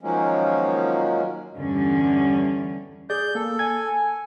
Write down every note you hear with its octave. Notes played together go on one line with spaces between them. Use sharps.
D#3 F3 F#3 G#3 A#3 C#4
E2 G2 D3 E3 G3 C#4
G#4 D5 G6
A#3 A4
G#5 G#6